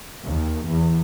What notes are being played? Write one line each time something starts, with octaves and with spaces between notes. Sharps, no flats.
D#2
E2